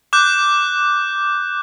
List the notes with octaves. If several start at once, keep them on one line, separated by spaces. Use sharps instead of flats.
D6 F#6 G6